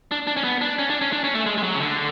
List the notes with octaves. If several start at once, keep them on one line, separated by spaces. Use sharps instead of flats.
D4
D4
C#4
B3
D4
C#4
D4
C#4
D4
C#4
A3
G#3
G#3
F#3
C#3
D3